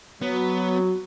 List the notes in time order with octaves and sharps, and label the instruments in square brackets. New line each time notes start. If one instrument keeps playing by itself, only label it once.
[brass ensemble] F#3 [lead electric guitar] B3